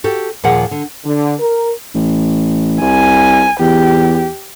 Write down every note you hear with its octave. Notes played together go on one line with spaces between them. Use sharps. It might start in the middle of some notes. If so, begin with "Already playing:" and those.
F#4 G4 A4
D#2 A#2 F3 F4 G#4 F#5
D3
D3
A#4
A1
C2 G#5
E2 G4